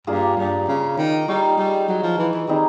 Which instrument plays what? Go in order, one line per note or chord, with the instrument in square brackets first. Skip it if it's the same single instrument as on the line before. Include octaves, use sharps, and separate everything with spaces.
[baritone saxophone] G2 [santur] A#3 D4 F4 G#4
[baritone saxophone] G2
C#3
D#3
[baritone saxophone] G3 [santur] D#4 G#4 C#5
[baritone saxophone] G3
F#3
F3
E3
E3
[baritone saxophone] D#3 [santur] G3 C4 D#4 G#4